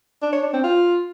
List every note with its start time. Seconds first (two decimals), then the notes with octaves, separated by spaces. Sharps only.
0.22 D4
0.33 C#5
0.43 D4
0.53 C4
0.64 F4